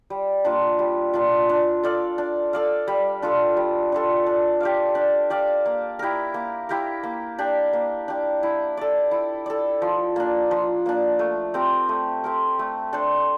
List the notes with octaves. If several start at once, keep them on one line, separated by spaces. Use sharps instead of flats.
G3
A#3 D4 F4
G3
A#3 D4 F4
D4
A4 D5 F5
D4
A4 D5 F5
G3
D4 F4 A4
G3
D4 F4 A4
D4
G4 D5 F5
D4
G4 D5 F5
A#3
E4 G4 A#4
A#3
E4 G4 A#4
A#3
D4 G4
A#3
D4 G4
E4
A4 D5
E4
A4 D5
F3
A#3 D4
F3
A#3 D4
A3
C4 G4 A#4
A3
C4 G4 A#4
A3
D4 A4 C5